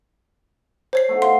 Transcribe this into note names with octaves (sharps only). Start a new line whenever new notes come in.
C5 C#5 C7
A3 B3 D#4
F5 C6 C7